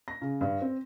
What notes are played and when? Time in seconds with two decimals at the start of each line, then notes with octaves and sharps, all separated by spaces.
0.08 A#6
0.22 C#3
0.41 G2
0.62 C4